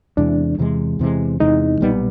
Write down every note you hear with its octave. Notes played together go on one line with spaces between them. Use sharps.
E2 C3 E3 G#3 D4
E2 C3 E3 G#3
E2 C3 E3 G#3
E2 C3 E3 G#3 D#4
B1 A#2 G3 B3